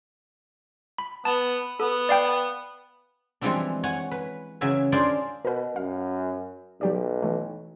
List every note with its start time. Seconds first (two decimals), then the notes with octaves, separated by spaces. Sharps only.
0.98 B5
1.25 B3 A5
1.80 B3 A4
2.09 D5 F5 G5
3.41 E3 F3 G3 G#3 C4 D4
3.83 C#5 F#5 G#5
4.11 B4
4.61 C#3 E3 F#3 E5 G#5
4.92 D4 F4 G#4 A#4 C5 D5
5.45 B2 A#4 B4
5.76 F#2 F5
6.81 B1 F#3 G4 D5
7.23 E3 A3